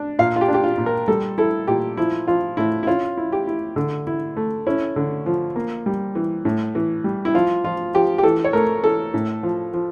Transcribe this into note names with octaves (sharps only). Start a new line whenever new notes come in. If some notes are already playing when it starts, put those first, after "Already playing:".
Already playing: D4
A#2 F5
F4
G4
D4
G4
F4
A#2
A#4
G3 A4
E4 A4
A#2 G4
F3 E4
F3 F4
A2 E4
E4
C#4 F4
E4
G4
E4
D3
E4
A3
C#4 E4
D3
F3
A#3
G3
E3
A2
E3
G3
E4
F3 F4
F3 F4
F3 G4
G4
E3 A4
C#5
A3 A#4
E3 A4
A2
F3
F3